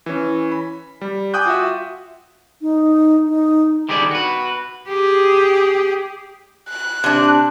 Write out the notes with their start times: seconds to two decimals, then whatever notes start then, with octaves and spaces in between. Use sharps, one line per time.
0.06 E3 C#4
0.52 B5
1.01 G3
1.34 G5 G#5 D6 D#6 F#6 G6
1.46 F4 F#4 E5
2.62 D#4
3.27 D#4
3.89 D3 D#3 G3 G#4 D5
4.11 F#4 B4
4.88 G4 G#4
6.69 F#6
7.04 C3 D4